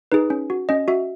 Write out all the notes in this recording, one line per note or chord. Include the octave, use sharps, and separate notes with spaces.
D#4 G#4 B4
C#4
F#4
C#4 D#5
F#4 E5